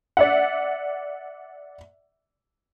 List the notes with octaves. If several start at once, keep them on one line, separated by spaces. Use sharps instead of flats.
D5 E5 F#5